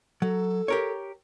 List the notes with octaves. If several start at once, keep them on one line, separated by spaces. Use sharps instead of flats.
F#3 A4
G4 A#4 C#5